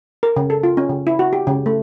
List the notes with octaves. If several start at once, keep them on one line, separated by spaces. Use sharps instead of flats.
A#4
C#3
A4
F4
C#4
C#3
E4
F#4
G4
C#3
A3